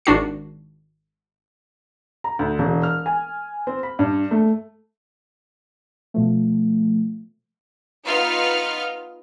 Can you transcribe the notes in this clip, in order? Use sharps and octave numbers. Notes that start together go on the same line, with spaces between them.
G#1 D4 F#4 C7
A#5
D2
E1
F6
G#5
C4
B5
G2
A3
B2 F3 A3
B3 D#4 F4 F6